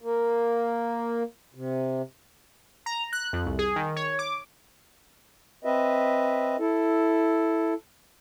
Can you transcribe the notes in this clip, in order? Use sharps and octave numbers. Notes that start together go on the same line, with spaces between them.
A#3
C3
A#5
F#6
F2
C2
G#4
D#3
C#5
D6
C4 B4 D#5 E5
E4 A4